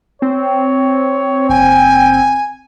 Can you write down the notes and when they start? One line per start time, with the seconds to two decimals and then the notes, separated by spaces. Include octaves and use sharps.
0.22 C4 C#5
1.49 F#1 G5 G#5